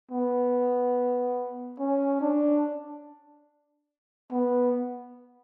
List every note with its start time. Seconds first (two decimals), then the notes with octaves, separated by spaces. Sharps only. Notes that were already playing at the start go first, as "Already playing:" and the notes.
0.11 B3
1.79 C#4
2.21 D4
4.31 B3